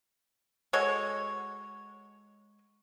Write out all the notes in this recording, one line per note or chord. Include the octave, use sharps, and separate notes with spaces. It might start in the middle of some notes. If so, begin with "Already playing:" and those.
G#3 F#4 A4 C#5